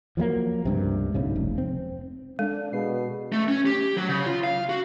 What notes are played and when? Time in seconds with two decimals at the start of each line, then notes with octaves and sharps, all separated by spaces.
0.17 F3 F#3 G#3 A#3
0.65 C#2 G2 C3
1.14 B1 G#2 C#3
1.36 F1
1.58 C4
2.39 G#3 D4 A4
2.73 B2 G#4 B4 C7
3.32 A3
3.48 C#4
3.66 G4
3.97 F#3
4.09 C#3
4.26 F4
4.44 F5
4.69 F#4